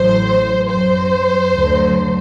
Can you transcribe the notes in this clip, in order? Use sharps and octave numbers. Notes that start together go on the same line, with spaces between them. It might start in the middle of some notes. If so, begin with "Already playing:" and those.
Already playing: A1 A2 F#3 C5
F#2 F#3 C5
D2 D3 F#3